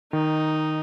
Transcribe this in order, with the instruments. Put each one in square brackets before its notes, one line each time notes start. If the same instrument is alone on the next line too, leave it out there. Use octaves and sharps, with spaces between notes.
[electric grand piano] D#3 [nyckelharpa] D#4